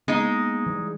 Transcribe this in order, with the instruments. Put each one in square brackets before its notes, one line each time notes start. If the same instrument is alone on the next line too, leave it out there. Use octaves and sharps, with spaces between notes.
[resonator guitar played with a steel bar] G#3 D#4 [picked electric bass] A#3 B3
[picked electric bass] E3 G3